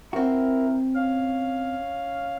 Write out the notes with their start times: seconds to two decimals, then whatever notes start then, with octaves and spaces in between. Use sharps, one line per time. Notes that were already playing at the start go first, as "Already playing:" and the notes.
0.13 C4 E4 F#4 A#4
0.95 C#4 F5